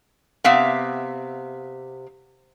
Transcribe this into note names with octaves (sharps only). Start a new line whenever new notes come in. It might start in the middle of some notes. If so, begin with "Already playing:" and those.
C3 B3 E5 F5